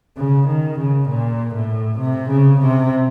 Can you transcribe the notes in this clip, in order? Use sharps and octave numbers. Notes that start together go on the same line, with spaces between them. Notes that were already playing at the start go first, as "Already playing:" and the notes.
C#3
D#3
C#3
A#2
A2
C3
C#3
C3